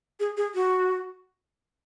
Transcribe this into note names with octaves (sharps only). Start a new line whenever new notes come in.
G#4
G#4
F#4